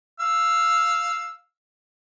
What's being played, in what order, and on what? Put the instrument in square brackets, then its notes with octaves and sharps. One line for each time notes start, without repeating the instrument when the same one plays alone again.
[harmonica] F5 E6